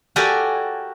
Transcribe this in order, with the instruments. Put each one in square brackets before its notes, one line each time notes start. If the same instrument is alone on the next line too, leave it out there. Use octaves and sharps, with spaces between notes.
[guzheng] F#4 G4 A4 A#4 D5 G#5